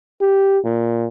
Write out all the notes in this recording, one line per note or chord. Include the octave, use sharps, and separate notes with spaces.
G4
A#2